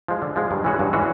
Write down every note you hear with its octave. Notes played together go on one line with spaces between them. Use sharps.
F3 G#3
D3
F3 G#3
G2
E3 G#3 C#4 F#4
G2
E3 G#3 C#4 F#4